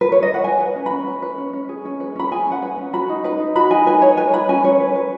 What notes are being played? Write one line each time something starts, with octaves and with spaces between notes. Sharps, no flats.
B4
C#5
D#5
F#5
B4 G#5
B4
C#4
C#4 B5
B4
B4
C#4
C#4
G#4
C#4
B4
C#4 B5
G#4 G#5
C#4 F#5
B4
C#4
F#4 B5
D#4
B4 B5
D#4
F#4 B5
D#4 G#5
B4 G#5
D#4 C#5
B4 G#5
B4 B5
C#4 G#5
C#4 C#5
B4
B4